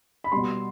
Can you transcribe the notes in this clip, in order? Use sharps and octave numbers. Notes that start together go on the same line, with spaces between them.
B5
B2 G3 C6